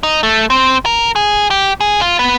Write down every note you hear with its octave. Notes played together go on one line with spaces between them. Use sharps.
D#4
A3
C4
A#4
G#4
G4
G#4
F4
B3